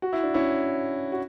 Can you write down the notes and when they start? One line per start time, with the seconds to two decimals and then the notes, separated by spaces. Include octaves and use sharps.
0.02 F#4
0.13 E4
0.24 D4
0.34 C#4 E4
1.12 F#4